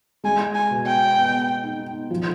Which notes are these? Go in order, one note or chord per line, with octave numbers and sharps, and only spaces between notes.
G#3 G#5
G#5
B2
G5
B3
D#4
F3